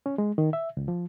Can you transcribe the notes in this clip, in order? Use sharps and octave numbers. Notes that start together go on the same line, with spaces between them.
C#4
G#3
D#3
E5
C#2
F3